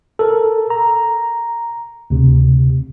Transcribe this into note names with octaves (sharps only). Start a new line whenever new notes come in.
A4 A#4
A#5
D2 C3